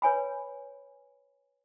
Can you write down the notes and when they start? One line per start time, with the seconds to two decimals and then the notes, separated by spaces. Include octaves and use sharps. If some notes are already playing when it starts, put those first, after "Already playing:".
0.02 B4 C#5 G#5 B5